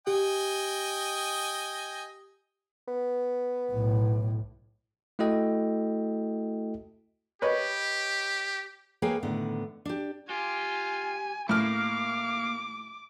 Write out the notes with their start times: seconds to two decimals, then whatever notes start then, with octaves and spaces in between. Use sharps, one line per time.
0.07 G4 D#5 G5 G#5
2.88 B3
3.72 B1 A2
5.19 A3 E4 F#4 A4 D#5 G5
7.42 G4 B4 C#5 D#5
9.02 A#3 G#4 B4 C#5 F5 G5
9.23 A2 D3 D#3 B3
9.85 D4 G4
10.30 F4 G4 G#5
11.49 A2 A#3 F5 D6 F6